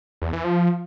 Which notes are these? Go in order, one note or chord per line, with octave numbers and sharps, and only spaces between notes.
E2
E3
F3